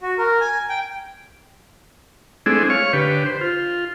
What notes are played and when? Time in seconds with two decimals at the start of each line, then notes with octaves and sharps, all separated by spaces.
0.01 F#4
0.18 A#4
0.41 G#5
0.69 G5
2.46 G#3 A3 C4 D4 E4 G#4
2.70 C#5 F5 C#6
2.93 D3 G4 B4
3.26 C5
3.41 F4